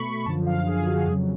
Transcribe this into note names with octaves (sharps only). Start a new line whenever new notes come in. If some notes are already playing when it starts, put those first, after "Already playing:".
Already playing: B2 A3 B5 C#6
F#2 D3 F3 A5
F5
G#4
F#4
F2 C#3 F#3 G#4